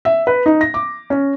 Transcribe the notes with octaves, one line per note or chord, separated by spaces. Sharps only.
E5
B4
D#4
A#6
D6
C#4